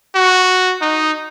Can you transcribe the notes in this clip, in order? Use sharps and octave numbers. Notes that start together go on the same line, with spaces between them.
F#4
D#4